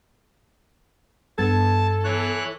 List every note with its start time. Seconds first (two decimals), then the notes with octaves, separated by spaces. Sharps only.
1.38 G2 B3 A4 A5 G#6
2.04 E3 C#5 F#6